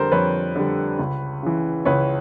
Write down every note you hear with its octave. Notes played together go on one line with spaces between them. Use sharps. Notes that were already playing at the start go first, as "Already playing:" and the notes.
Already playing: F2 D3 G3 A4 A#4 C5
F2 B4 C#5
D3 G3
C#2
C#3 E3
C#2 B4 C#5